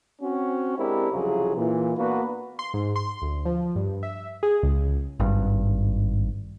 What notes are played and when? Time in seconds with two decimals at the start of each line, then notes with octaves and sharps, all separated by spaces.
0.22 C4 C#4 F#4
0.77 G#3 C4 D4 E4 G4 A#4
1.11 C2 F2 C#3 F#3 F4 G#4
1.56 A#2 E3
1.97 A#3 B3 D4 F#4 B4
2.59 C6
2.74 G#2
2.96 C6
3.22 D2
3.45 F3
3.75 G2
4.03 E5
4.43 G#4
4.63 C#2
5.20 G#1 G2